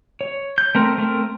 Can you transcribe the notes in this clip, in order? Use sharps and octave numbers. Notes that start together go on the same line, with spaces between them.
C#5
G6
A3 C4 A#4
A3 C4 A#4